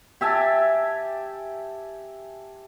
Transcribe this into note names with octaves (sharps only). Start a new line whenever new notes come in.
G4 E5 G#5 A5